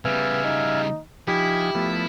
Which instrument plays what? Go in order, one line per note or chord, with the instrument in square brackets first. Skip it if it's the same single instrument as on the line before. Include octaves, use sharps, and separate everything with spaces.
[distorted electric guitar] C#3 G3 [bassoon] B3 [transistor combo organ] E5 F5 G#5
[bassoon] D#4
[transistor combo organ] F3 D#4 G#5 [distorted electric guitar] E4 [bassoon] G4
[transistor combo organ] F3 A3 B3